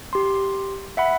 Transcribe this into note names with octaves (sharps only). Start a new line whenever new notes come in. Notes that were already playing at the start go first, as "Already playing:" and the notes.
G4 C6
E5 F#5 B5